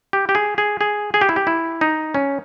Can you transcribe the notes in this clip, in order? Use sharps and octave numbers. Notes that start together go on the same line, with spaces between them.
G4
G4
G#4
G#4
G#4
G#4
G4
E4
G4
E4
D#4
C#4